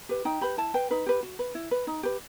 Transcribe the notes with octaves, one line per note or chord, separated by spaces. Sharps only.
G4 B4
D#4 G5
G4 B4 B5
E4 A5
B4 G5
D#4 B4
G4 B4
F#4
B4
E4
B4
D#4
G4 B4